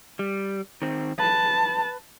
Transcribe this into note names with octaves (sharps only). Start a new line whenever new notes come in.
G3
D#3 C4
B4 A5